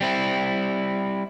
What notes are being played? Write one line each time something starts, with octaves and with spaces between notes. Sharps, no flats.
G3 C4 E4